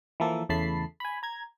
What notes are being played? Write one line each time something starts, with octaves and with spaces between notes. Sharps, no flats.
E3 F3 A#3 A4
E2 C#3 A3 A5 B5 C7
G#5 B5
A#5 G#6